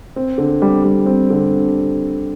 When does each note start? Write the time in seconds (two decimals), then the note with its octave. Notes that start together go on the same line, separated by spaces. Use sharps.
0.16 C4
0.38 D3
0.62 G3
0.84 G3
1.06 C4
1.30 D3